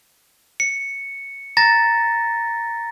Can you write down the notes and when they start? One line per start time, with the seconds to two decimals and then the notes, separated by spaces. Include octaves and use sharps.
0.60 C#7
1.57 A#5 A6 A#6